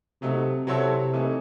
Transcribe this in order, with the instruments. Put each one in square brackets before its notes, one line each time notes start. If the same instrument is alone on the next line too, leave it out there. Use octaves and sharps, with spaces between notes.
[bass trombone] C3 [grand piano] F#3 A3 D#4
[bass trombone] C3 [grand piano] F#3 C4 E4 A4 C#5
[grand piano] E3 A3 D#4